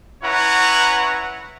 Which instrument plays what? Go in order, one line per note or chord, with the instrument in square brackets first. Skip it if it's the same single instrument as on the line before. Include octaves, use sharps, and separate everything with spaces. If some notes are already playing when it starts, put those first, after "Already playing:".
[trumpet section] C#4 E4 B4 C#5 F#5 A#5